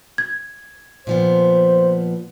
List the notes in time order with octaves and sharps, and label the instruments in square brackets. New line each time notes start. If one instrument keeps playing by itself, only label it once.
[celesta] G#6
[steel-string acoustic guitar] A#2 F3 B3 [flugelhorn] C5